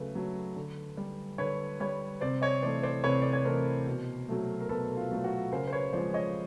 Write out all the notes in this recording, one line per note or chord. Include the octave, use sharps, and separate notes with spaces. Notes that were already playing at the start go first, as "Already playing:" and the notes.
Already playing: C#3 F#3 A3 B4
F#3 A3
D3
G3
D3 B4 C#5
G3 B4 C#5
C3 C5 D5
C#5 D#5
E3 A3 C5 D5
C5 D5
C3 B4 C#5
D5
C#5
E3 A3 A#4 C5
B2
F#3 A3
A#4
B2 A4 B4
F4
F#3 A3
F#4
C#3 A#4 C5
C5
B4 C#5
F3 G#3 C5 D5
C#5 D#5